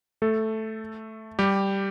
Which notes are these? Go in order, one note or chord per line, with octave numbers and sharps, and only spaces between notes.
A3 A4
G3 G4